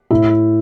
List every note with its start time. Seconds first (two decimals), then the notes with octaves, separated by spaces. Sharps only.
0.10 A2 E4